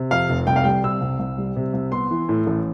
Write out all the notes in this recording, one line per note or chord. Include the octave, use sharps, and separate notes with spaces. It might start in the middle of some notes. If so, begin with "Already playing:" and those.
Already playing: C3
F2 F5
F1
C2 G5
F5
G3 G5
C3 E6
C2
C2
G3
C3
C2
B3 C6
E3
A2
A1